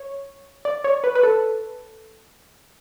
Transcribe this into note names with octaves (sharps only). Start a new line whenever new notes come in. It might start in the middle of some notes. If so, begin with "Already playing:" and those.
Already playing: C#5
D5
C#5
B4
B4
A4